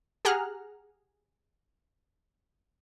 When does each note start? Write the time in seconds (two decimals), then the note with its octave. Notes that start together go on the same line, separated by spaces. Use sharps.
0.25 G4 G#4 F#5 A#5 F6 F#6